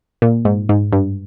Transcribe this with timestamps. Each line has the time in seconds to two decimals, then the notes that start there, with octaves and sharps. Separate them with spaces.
0.22 A#2
0.45 G#2
0.69 G#2
0.93 G2